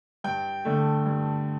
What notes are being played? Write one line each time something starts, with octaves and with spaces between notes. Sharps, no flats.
G2 G5
D3 A3
G2